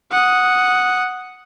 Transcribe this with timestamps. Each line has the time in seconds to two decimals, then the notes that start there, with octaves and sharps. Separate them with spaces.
0.12 F#5 D#6